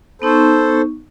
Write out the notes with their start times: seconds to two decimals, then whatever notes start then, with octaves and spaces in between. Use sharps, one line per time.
0.22 B3 D#4 A4 C5 C#6